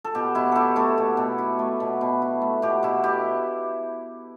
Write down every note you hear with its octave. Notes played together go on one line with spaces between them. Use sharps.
A4
B2 G4
B2 E4
E4 G4 A4
A3 E4 A4
B2
B2
E4
A3
B2
B2
E4
A3
B2 G4
B2 E4
E4 G4